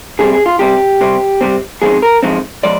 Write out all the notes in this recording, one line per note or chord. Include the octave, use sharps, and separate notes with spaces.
C3 G3 C4 G#4
G#4
F4
C3 G3 C4 G4
C3 G3 C4
C3 G3 C4
G#2 F3 G#3 C4 D#4 G#4
A#4
G#2 F3 G#3 C4 D#4
F3 G#3 D5